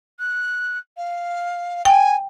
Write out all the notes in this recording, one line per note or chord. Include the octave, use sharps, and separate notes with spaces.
F#6
F5
G5 G#5